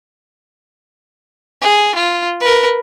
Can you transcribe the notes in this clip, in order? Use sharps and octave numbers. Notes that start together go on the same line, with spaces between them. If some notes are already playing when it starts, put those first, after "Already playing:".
G#4
F4
A#4 B4